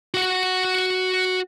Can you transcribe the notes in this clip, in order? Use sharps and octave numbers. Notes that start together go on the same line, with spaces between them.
F#4 F#5